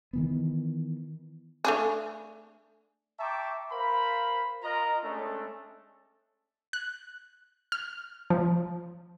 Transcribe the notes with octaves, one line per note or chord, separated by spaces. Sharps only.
D#3 E3 B3
A3 D4 G#4
E5 G5 A5 A#5 C#6 D6
A#4 C5 F5 B5
F4 A#4 D#5 A#5
G#3 A3 C#4 D4 A4
F#6
F6
F3